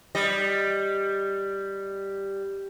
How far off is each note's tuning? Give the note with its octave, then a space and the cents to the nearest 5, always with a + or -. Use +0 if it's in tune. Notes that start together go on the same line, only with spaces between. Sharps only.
G3 +0 D#5 +0